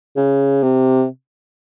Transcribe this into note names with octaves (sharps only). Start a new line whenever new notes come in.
C#3
C3